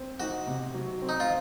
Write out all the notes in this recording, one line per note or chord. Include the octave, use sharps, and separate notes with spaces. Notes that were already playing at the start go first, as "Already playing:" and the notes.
Already playing: C4
D#4 F#4
C3
F#3
C4
D#4
F4